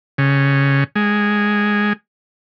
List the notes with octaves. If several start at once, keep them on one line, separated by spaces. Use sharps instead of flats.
C#3
G#3